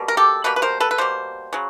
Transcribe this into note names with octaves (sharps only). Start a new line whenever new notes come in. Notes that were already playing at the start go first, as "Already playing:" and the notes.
Already playing: B2 G3 A#3
A#4
G4 A4
B2 G3 A#3 B4
B4
A#4 C5
A4 B4
B4
B2 G3 A#3 C5
C#3 F#3